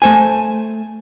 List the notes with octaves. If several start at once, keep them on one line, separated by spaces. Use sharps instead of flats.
A3 C5 G#5